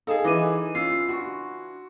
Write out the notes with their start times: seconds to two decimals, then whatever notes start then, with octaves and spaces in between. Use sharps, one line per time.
0.07 D#4 G#4 A4 F5 A5 D#6
0.24 E3 D#5 D6 D#7
0.75 C#4 F4 E6 C7
1.09 D4 F#4 C6 C#6